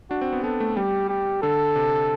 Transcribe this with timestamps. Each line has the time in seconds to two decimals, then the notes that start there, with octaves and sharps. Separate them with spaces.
0.10 D4 F#4
0.21 C4
0.33 B3
0.43 B3 A4
0.60 A3
0.76 G3 G4
1.09 G4
1.42 D3 A4
1.76 C3